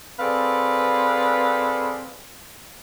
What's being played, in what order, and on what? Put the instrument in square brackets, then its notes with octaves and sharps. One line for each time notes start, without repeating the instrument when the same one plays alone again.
[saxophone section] C4 G#4 A4 B4 D5 F5